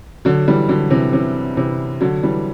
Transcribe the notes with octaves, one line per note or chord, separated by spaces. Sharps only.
D3 F#3
E3 G3
D3 F#3
C3 E3
C3 E3
C3 E3
D3 F#3
E3 G3